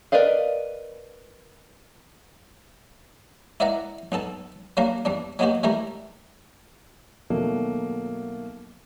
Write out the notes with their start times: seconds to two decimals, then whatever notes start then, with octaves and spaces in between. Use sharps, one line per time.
0.12 A#4 B4 D5 D#5 F5
3.60 E4 B4 D5 E5 F#5 A#5
4.12 B1 B3 A4 A5
4.77 F#3 G3 A#3 D4 A#4 F5
5.05 E2 G3 D4
5.39 F#3 G#3 A#3 B3 F#4 G4
5.63 E3 G3 A3 G4 A#4
7.30 B2 D#3 F#3 A3 A#3